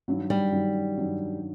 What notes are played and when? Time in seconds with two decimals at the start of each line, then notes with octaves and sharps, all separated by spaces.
0.08 G2 D#3 F#3
0.30 G3
0.53 G2 D#3 F#3
0.97 G2 D#3 F#3